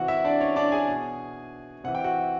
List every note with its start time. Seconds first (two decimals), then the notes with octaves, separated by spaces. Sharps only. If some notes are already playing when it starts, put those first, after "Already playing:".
Already playing: C3 E3 F#4 F#5
0.08 E4 E5
0.25 D4 D5
0.41 C#4 C#5
0.56 D4 D5
0.72 G#4 G#5
0.88 B2
1.84 C3 E3 F#5
1.95 G5
2.04 F#4 F#5